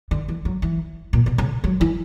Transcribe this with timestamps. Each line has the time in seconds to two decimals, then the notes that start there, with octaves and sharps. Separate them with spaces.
0.11 D3
0.29 E3
0.45 F#3
0.62 E3
1.13 A#2
1.26 B2
1.38 C#3
1.64 F#3
1.81 E3